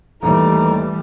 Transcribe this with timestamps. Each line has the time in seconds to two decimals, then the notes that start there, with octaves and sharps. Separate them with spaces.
0.22 D#2 E3 G3 A3 D#4 A4 A#5